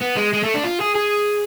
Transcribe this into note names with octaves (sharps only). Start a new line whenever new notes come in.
B3
G#3
G#3
A3
D4
F4
G#4
G#4